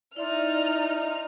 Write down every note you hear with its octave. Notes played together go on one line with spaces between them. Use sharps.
D#4 E4 D5 E5 C6 F6